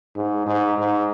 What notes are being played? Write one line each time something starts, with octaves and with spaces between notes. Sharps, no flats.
G#2
G#2
G#2